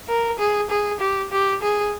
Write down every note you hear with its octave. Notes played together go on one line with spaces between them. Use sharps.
A#4
G#4
G#4
G4
G4
G#4